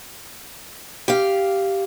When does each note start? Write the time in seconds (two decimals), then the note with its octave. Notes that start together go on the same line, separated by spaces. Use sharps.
1.08 G4 F5